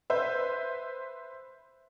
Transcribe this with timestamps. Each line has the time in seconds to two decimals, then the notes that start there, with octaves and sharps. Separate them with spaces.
0.10 B4 C5 E5